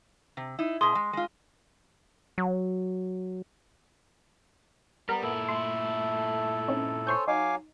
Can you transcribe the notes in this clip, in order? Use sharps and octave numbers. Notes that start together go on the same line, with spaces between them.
C3
D#4 E4
B2 G#4 C6 D#6
G#3
G#3 F4
F#3
G3 B3 A#4
A#2 E4 A4
A3 C6
C4 C#4 D#4
C5 C#5 G#5 C6 C#6 G6
F#3 D#4 F5 G#5 D6